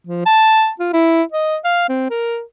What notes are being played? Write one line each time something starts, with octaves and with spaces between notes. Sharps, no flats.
F3
A5
F4
E4
D#5
F5
C4
A#4